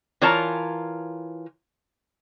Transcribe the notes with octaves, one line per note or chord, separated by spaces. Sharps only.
E3 F4 A#4 C#5 A5 A#5